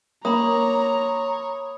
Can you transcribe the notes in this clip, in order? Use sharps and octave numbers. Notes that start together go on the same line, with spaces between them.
A#3 C#5 A#5 B5 D#6